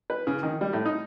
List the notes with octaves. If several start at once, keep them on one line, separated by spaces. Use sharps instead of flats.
B4
C#3
D#3
G3
A2
D#4